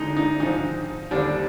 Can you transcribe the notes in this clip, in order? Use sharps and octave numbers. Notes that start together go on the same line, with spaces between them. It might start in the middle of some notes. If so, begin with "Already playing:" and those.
Already playing: D2 D3 G#3 D#4
D#4
G#2 F3 C4 D#4
D#2 D3 G3 C4 D4